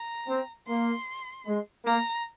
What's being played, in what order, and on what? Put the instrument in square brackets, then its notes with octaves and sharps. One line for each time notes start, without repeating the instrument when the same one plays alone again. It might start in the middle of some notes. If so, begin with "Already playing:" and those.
Already playing: [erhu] A#5
[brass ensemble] C4
[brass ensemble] A#3 [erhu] C6
[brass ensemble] G#3
[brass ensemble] A#3 [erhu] A#5